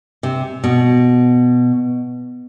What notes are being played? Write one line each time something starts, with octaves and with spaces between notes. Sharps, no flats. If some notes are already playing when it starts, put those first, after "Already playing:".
C3
B2